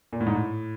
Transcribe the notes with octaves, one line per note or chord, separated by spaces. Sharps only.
A#2
A2
G#2
A2